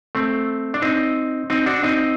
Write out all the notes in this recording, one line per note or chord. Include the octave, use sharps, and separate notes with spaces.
A3 C4
D4
C4 D#4
C4 D#4
D4 F#4
C4 D#4